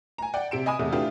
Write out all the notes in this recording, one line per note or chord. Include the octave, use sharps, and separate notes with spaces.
G#5 A#5
D5 F#5 G5
C3 D7 E7
D#5 G#5 B5 D#6
E2 C3 A3
A3 D4 E4 F4 G4 B4